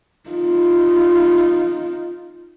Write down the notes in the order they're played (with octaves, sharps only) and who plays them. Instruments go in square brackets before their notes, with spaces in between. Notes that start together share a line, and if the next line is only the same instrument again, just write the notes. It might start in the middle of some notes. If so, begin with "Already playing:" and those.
[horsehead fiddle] D#4 F4